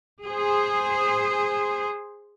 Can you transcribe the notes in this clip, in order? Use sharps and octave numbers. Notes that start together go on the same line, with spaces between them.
G#4 C5